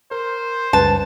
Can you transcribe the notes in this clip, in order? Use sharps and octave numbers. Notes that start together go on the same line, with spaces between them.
A#4 C5
C#2 F#2 G3 B4 A5